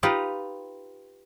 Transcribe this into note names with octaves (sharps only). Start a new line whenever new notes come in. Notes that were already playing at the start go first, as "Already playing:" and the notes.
D#4 F4 G4 B4 D#5